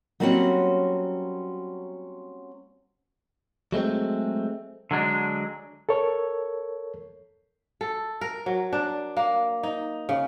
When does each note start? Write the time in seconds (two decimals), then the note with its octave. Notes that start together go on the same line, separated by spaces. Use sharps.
0.20 F#3 G3 A#3 C4 C#4 F#4
3.72 F#3 G#3 A3 C4
4.91 D3 F#3 G#3 D4
5.89 A4 A#4 C#5
7.81 A4
8.21 A#4
8.46 F#3
8.73 D4
9.17 A#3
9.63 D#4
10.09 C#3